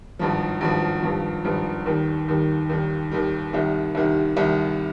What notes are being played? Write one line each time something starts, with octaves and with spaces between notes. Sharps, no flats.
G#1 G2 F3
G#1 G2 F3
G#1 G2 F3
G#1 G2 F3
D#2 D#3 G3
D#2 D#3 G3
D#2 D#3 G3
D#2 D#3 G3
C2 C3 D#3 G3
C2 C3 D#3 G3
C2 C3 D#3 G3